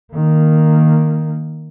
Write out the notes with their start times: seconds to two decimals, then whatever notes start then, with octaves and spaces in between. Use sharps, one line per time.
0.14 D#3 A#3